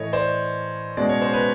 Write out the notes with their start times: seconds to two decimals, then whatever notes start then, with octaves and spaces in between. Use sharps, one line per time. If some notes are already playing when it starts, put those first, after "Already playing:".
Already playing: A2 E3 A3 C#5 D#5
0.13 C5 D5
0.97 B2 G#3 C#4 D5
1.09 C#5
1.22 C5
1.33 B4 C#5